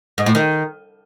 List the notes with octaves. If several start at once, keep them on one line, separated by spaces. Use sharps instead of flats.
G#2
A2
D#3